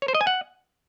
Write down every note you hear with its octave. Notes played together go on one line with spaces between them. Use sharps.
C#5
C5
D#5
G#5
F#5